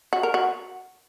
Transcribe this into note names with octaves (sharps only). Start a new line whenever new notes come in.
F#4
A#4
F#4